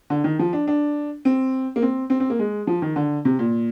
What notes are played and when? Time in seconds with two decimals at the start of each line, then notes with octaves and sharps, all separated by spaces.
0.10 D3
0.24 D#3
0.39 F3
0.53 D4
0.68 D4
1.25 C4
1.76 A#3
1.82 C4
2.10 C4
2.20 C4
2.30 A#3
2.39 G#3
2.67 F3
2.82 D#3
2.96 D3
3.25 C3
3.39 A#2